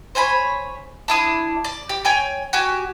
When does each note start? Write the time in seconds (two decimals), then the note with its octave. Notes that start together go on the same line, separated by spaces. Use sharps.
0.15 C5 C#5 G#5 B5
1.08 D4 E4 D#6
1.64 D5
1.89 G4
2.05 C#5 G5 G#5
2.53 F#4 G4 G#5